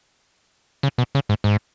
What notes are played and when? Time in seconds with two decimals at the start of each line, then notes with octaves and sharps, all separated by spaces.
0.83 C#3
0.98 B2
1.15 C#3
1.29 G#2
1.44 G#2